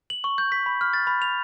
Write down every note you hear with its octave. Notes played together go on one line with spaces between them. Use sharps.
F#7
C#6
G6
B6
B5
F6
A6
B5
F7